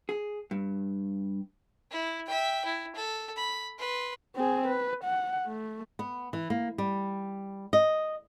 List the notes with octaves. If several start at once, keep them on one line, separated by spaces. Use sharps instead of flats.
G#4
G2
E4
E5 G5
E4
A4
B5
B4 C6
C4 G#4
B4
F#5
A3
B3
E3
A#3
G3
D#5